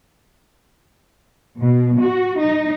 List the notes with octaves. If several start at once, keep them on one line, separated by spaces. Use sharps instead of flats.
B2
F#4
D#4